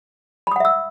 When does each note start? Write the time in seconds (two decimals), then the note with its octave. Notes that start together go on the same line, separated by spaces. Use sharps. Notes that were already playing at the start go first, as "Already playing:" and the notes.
0.47 B5
0.51 D#6
0.56 F#5
0.60 E5
0.65 E6